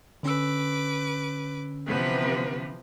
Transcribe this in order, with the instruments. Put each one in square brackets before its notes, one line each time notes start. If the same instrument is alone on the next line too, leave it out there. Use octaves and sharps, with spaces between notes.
[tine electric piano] D3 C#4 E6 [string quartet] B4 D6
[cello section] C3 B3 B4 [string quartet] E3 F3